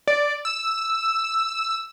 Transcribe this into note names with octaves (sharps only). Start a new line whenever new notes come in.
D5
E6